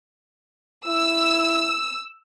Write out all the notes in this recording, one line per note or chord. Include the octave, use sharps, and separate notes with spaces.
E4 E6